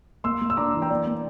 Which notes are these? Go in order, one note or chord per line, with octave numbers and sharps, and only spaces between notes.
A#3 C6 E6
A#3
E6
D4 A#5 D6
E3
G5 A#5
A#3 D5
A#3